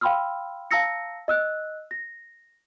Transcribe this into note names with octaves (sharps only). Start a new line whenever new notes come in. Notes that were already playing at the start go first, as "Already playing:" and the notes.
F5 G5 B5 C6 E6 F6
F5 A5 A#5 E6 A#6 C#7
D#5 E6 F#6
A#6